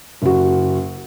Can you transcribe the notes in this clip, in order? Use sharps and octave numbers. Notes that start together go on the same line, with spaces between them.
F#1 F#4